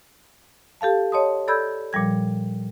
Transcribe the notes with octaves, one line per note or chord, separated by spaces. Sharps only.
G4 A4 F5 A5
C#5 D#5 A5 C6 D#6
A4 D5 B5 E6 G6 G#6
A#2 F3 G3 G#6